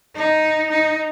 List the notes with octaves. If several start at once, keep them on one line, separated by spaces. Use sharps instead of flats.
D#4
D#4